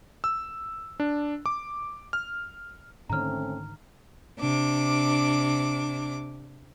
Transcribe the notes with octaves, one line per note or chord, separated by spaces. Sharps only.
E6
D4
D6
F6
G#2 D3 D#3 A3 C4 C#4 A#5 F6
C3 D4 D6